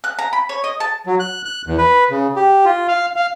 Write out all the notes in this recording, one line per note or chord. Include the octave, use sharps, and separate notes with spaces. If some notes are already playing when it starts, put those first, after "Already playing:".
F#6
A#5
B5
C#5
D#5
A5
F#3
F#6
F#6
E2
B4
C#3
G4
F4
F5
F5